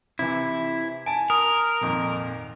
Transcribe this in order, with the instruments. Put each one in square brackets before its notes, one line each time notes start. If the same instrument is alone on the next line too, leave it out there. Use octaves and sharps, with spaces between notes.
[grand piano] C3 E3 [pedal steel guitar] E4
[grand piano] G#5 A5 [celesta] D7
[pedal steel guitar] A#4 [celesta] D#6
[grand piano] G#1 F2 A#2